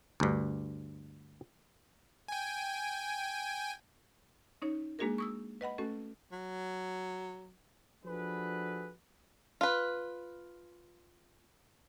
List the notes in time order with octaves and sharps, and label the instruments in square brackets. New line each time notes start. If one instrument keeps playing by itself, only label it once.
[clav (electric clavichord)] D2 G2
[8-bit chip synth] G5 G#5
[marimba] C#4 D#4 C#5
G#3 A#3 D4 F#4 G#4 A#4
C#6 D#6 E6
B4 D#5 F#5 B5
A3 C#4 F#4 A4
[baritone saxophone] F#3
[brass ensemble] F3 D4 F#4 G#4 A4 B4
[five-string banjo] F4 B4